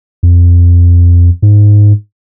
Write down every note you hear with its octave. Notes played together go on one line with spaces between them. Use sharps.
F2
G#2